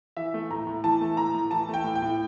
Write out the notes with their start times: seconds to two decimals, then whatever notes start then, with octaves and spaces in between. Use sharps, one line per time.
0.17 E3 E5
0.34 A3
0.50 A2 A#5
0.67 A2
0.84 E3 A5
1.01 A3
1.17 A2 A#5
1.34 A2
1.51 E3 A5
1.69 A3 G5
1.84 A2
1.95 G5
2.02 A2